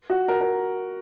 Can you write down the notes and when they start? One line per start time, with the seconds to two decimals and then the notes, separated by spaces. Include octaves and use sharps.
0.10 F#4
0.28 A#4
0.41 A#4